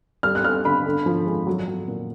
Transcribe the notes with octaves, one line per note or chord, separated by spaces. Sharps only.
G3 F6
F#6
G3 F6
D3 B5
D3
F3
G#3
F#3
F#3
A#2